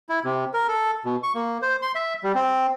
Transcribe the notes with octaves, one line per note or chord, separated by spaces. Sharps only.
E4
C3
A#4
A4
B2
C#6
A#3
C5
C6
E5
G3
C4